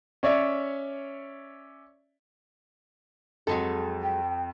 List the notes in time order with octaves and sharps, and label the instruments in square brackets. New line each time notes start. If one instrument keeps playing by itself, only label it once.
[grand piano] C#4 C#5 D5 E5
[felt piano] F2 [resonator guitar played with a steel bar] F#3 G#3 A4
[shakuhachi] G5